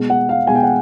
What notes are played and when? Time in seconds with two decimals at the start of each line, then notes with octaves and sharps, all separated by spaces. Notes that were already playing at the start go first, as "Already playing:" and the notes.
Already playing: B2 G#3
0.10 F#5
0.29 F5
0.47 B2 G#3 G#5
0.55 G5
0.63 F#5